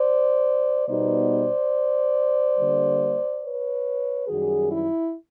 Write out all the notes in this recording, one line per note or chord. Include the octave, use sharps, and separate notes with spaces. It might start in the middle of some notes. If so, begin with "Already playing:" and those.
Already playing: C5 D5
B2 G3 B3 D#4 C5 D5
D3 G3 A#3
B4 C#5
F#2 D#3 G3 F#4 G#4
E4